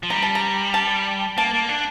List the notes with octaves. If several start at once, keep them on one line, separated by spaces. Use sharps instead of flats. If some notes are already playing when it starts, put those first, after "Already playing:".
F3
G3 A#5
A5
A#5
A5
A#3 A5
A#3
D4